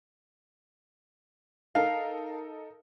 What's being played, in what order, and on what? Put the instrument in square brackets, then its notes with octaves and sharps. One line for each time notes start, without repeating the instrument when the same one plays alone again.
[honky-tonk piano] D#4 A4 A#4 [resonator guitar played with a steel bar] F5